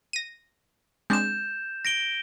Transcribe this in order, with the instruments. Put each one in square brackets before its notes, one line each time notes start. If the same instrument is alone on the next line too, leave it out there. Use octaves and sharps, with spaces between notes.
[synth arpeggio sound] A#6 D#7
[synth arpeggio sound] G#3 C4 D4 [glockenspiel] G6 E7
[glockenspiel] A#6 D7 G7